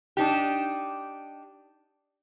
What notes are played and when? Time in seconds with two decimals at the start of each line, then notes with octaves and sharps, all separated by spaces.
0.17 D4 D#4 G4